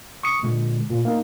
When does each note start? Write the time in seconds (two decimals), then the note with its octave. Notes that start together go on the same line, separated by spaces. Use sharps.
0.23 C#6 D#6 C#7
0.43 A#2 D3 G#3
0.90 A#2
1.05 A#3 D#4